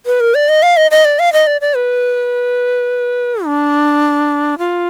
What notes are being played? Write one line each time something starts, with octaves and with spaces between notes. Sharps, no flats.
B4
A#4
D5
D#5
F5
D#5
D#5
D5
F5
D#5
D5
D5
B4
D4
F4